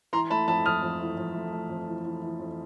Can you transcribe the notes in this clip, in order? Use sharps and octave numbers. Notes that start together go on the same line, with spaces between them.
E3 A#5 C6
A3 A5 B5
F2 A5 B5
F2 D#6 F6
F2
E3
F2
A3
A3
F2
E3
E3
E3
F2